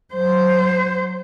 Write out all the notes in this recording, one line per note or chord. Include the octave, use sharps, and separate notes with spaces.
F#3 C5